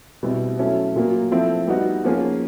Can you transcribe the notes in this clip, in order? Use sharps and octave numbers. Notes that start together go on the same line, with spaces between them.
B2 G3 C4 E4
F#3 A3 C#4 E4
A#2 F#3 A#3
F3 A3 C4 E4
G3 B3 D#4 F#4
F3 A#3 C#4 F4 G#4